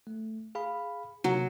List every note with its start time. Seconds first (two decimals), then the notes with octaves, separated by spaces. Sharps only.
0.07 A3
0.55 G#4 F5 B5
1.24 C3 F#3 A#3